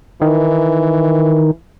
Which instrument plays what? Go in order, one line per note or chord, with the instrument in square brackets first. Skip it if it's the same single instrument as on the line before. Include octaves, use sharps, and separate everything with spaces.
[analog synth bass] D#3 [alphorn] E3